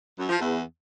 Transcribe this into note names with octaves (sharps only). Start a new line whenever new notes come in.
F#2
F3
E2